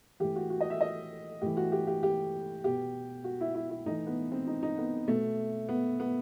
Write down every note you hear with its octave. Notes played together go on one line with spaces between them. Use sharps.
A2 E3 G4
F#4
F#4
D#5
E5
D#5
A2 E3 G4
F#4
G4
G4
G4
B2 G4
F#4
E4
E4
E4
A2 E3 D#4
B3
C4
D#4
D#4
B3
B2 A3
B3
B3